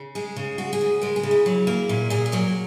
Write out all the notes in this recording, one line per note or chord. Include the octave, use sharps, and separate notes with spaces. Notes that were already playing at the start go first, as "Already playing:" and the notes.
Already playing: C#3
G#3 G#4
C#3
G#3 F#4
G#4
C#3
G#3 A#4
G#4
C#3
E4
F#3
A#3
A#2 E4
A#2 G#4
G#4
F#3 A#4